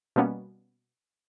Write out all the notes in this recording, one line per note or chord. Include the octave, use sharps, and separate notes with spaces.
B2 G3 A#3 B3 C#4